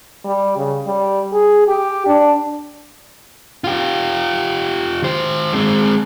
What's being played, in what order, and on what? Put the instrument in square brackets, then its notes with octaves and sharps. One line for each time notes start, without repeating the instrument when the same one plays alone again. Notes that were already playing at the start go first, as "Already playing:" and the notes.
[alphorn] G3
C#3
G3
G#4
G4
D4
[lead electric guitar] F4 G4
D#3 C5
G#3 C4